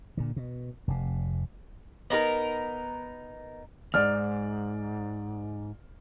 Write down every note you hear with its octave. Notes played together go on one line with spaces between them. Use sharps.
A#2 D3
B2
F1 C3
B3 D#4 G4 A#4
D#2 G#2 D5 F6